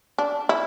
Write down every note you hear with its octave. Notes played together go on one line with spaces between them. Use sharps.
D4
E4